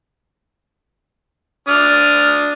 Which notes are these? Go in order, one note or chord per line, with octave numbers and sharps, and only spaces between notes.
D4 D#6 F6